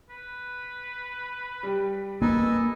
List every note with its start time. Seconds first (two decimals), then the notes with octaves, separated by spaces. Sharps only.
0.10 B4
1.63 G3 G4
2.22 A#3 A4 B4 D#5 G#5